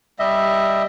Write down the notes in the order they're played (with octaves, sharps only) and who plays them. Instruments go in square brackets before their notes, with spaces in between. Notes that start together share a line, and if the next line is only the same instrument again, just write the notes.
[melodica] G3 D#5 E5